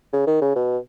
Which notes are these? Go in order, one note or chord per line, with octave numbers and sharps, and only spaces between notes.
C#3
D#3
C#3
B2